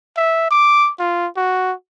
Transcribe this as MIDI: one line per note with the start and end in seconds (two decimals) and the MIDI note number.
0.17 0.48 76
0.51 0.90 86
0.99 1.27 65
1.37 1.73 66